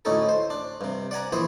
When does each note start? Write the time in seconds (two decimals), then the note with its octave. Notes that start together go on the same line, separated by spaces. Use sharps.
0.05 D2 A2 C#4 D#4 A4
0.29 C5
0.50 D4
0.81 G2 C3
1.11 D5 F#5 G#5 A#5
1.32 A#1 E3 E4 C5 D#6